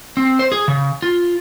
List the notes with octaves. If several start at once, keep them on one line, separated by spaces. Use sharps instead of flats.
C4
C5
G#4
C#3
F4